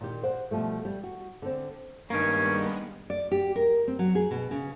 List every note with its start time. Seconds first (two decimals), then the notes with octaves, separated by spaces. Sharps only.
0.01 A#2 D#3 G4
0.23 C5 D5 F#5
0.51 B2 F3 G3 A3
0.85 G3
1.04 F#4
1.42 D3 C4
2.10 G2 D#3 G3 G#3 A#3 B3 C#4
3.10 D5
3.32 G4
3.56 A#4
3.88 C4
3.99 F#3
4.15 G#4
4.31 B2
4.51 C#3